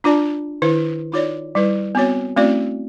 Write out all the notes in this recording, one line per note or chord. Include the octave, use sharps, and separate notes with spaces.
D4 F4 D5 A5
D#3 E4 C5
D#4 F4 C#5 D5
G3 E4 B4
B3 C4 F#4 C#5
A3 C4 C#4 E4 F#4 D5